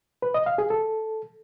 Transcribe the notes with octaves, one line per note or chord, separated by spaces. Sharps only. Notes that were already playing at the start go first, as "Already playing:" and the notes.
B4
D#5
F5
G#4
A4